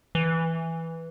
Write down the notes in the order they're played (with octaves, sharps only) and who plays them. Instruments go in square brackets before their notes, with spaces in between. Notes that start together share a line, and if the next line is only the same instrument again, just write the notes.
[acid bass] E3